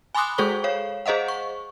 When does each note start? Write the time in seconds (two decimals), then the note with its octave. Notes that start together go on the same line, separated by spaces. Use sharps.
0.15 G#5 B5 C6 D6 D#6 F#6
0.38 G#3 G#4 A4 C5 C#6 G7
0.64 C#5 F5
1.06 G#4 C5 D#5 F5 F#5
1.28 C#6